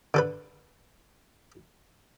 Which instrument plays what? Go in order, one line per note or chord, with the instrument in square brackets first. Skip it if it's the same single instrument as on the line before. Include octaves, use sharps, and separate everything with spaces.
[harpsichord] D3 A4 B4